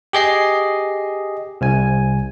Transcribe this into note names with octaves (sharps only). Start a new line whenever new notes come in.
G4 G#4 D#5 C7
C2 G#5